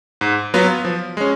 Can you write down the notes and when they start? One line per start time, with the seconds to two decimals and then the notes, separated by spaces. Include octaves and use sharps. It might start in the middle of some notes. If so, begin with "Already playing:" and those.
0.21 G#2
0.54 F#3 B3 F4 B4
0.85 F3
1.17 G#3 C#4